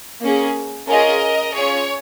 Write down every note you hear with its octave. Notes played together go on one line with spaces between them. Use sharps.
A#3 C#4 G#4
C#4 F4 G#4 A#4 D#5
C#4 F4 G#4 C#5